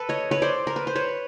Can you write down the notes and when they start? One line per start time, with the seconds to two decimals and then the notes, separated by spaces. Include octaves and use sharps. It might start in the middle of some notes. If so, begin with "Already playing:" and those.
Already playing: A4 B4
0.09 C#5 D#5
0.31 B4 C#5
0.42 C5 D5
0.67 A#4
0.76 B4
0.87 C5
0.95 B4 C#5